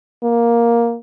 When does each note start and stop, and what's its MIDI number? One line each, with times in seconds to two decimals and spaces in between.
0.24 0.97 58